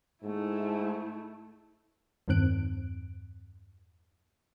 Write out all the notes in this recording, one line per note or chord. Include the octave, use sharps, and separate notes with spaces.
G#2 A3 E4
E2 G2 D#3 C4 F#6 D7